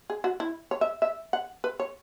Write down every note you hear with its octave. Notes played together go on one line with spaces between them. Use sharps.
G#4
F#4
E4
C#5
E5
E5
F#5
B4
C#5